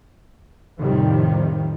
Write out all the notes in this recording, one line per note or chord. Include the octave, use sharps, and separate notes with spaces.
F2 A2 C3 D#3 F3 G3